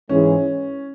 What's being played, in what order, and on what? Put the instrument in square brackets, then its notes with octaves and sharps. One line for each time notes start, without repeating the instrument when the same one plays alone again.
[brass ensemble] G#2 E3 G#3 E4 G#4 [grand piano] C#4